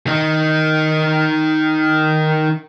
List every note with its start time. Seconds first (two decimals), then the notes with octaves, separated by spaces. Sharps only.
0.07 D#3 D#4